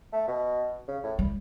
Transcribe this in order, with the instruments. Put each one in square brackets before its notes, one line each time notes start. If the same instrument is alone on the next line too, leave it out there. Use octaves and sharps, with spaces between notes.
[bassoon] A3
B2
C#3
A2
[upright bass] G3